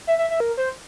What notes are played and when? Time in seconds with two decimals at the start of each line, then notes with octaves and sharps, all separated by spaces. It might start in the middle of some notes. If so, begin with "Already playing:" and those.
0.07 E5
0.18 E5
0.30 E5
0.40 A#4
0.57 C5